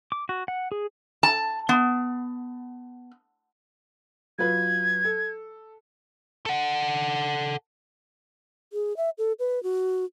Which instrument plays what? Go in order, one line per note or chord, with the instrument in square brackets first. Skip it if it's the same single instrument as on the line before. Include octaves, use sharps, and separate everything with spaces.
[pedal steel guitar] D6
F#4
F#5
G#4
[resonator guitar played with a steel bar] A5
B3
[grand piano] F#3 F4 B4 [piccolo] G#6
[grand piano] A4
[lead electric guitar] A4 F#5
[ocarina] G#4
E5
A4
B4
F#4